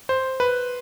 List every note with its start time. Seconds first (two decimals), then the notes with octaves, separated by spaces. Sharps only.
0.09 C5
0.40 B4